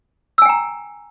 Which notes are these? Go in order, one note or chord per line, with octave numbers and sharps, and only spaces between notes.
G5 G#5 A#5 E6